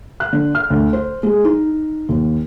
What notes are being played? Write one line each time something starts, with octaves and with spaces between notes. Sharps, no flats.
F#6
D3
F6
D2
C5
G#3
D#4
D#2